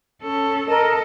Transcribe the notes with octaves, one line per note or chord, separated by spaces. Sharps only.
C#4 A4
A4 A#4 D#5